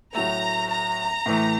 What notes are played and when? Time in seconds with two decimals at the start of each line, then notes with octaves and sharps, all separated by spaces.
0.14 A2 F#3 A3 A#5
0.71 A#5
1.26 A2 E3 A3